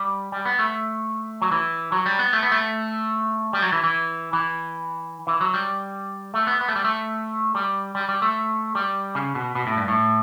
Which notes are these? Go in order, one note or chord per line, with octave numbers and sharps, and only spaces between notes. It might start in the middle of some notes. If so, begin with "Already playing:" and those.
Already playing: G3
G3
B3
A3
F#3
E3
F#3
G3
B3
A3
B3
A3
G3
F#3
E3
E3
E3
E3
F#3
G3
A3
B3
B3
A3
G3
A3
G3
G3
G3
A3
G3
C#3
B2
B2
A2
G2
A2